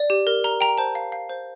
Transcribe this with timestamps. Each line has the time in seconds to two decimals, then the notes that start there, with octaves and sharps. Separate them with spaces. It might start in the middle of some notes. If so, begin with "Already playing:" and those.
Already playing: D5
0.10 G4
0.27 A#4
0.44 A#4 A#5
0.61 G5 A#5
0.78 C5 A5
0.95 F5
1.12 F5
1.30 C5